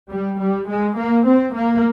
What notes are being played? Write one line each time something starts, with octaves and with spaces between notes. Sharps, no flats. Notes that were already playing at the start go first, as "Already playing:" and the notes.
G3
G3
G#3
A#3
C4
A#3